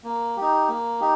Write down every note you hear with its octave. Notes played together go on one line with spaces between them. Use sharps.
A#3
D#4 G4
A#3
D#4 G4